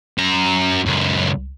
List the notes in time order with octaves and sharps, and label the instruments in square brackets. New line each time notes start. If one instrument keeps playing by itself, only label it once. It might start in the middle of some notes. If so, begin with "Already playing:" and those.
[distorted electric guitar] F#2 A#5
C#2 F#2